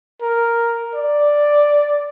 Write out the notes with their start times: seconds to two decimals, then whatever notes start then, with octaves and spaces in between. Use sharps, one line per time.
0.22 A#4
0.95 D5